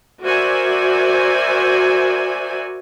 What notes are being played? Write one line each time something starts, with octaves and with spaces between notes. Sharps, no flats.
F#4 A#4 C5 D5 E5 G#5